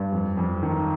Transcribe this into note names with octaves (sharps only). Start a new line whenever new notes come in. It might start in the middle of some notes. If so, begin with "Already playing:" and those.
Already playing: G2
F2
F2
D#3